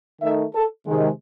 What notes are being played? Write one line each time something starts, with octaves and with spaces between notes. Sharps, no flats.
D#3 A3 D#4 E5
A4
C3 D#3 G#3